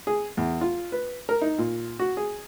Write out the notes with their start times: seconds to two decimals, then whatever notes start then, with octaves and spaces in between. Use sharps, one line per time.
0.07 G#4
0.37 E2
0.61 F4
0.92 B4
1.29 A#4
1.41 D#4
1.58 A#2
1.99 F#4
2.17 G#4